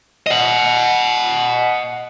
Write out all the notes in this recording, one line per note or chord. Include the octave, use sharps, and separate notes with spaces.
D#5 F#5